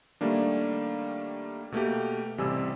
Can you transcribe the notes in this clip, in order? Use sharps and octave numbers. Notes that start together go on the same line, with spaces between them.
D#3 G3 A3 A#3 D4
B2 A3 A#3 G4
A1 C3 G3 G#5 E6